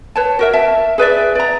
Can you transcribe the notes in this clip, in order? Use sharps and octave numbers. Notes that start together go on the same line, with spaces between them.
B4 C#5 A5
F#4 A#4 E5
E5 A5
G#4 B4 D5 E5
D5 A#5